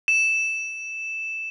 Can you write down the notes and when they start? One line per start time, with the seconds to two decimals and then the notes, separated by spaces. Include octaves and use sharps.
0.08 E7